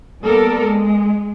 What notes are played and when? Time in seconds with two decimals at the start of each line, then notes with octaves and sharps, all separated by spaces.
0.22 G3 A#3 B3 A4 A#4 D5
0.60 G#3